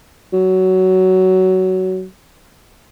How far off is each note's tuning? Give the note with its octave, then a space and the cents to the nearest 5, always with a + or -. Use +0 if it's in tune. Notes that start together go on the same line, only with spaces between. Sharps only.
F#3 +15